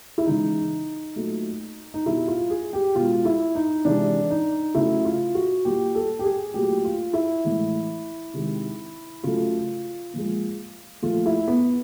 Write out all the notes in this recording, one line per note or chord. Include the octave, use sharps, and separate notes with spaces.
E4
C#3 E3 G#3 D#4
A#2 F#3 A3
D#4
B2 G3 E4
F4
G#4
G4
B2 G#3 F4
E4
D#4
C3 E3 G#3 D4
D#4
C#3 F#3 A3 E4
F4
F#4
A#2 G3 G4
A4
G4
G#4
A#2 F#3 A3 G4
F4
E4
A2 E3 G#3
C3 D#3 G#3
C#3 F#3 A3 F4
A#2 F3 G#3
A#2 F3 A3 F4
E4
B3